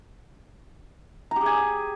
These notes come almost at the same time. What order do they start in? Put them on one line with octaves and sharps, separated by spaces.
A#5 G4 G#4 G#5